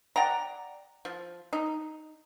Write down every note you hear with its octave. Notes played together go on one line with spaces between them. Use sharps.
D5 F#5 G5 A#5
F3
D#4